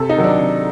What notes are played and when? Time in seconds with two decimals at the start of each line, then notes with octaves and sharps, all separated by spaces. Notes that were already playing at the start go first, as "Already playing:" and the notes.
Already playing: C3 A4
0.09 D#4
0.17 D#3 F#3
0.24 D4
0.39 C3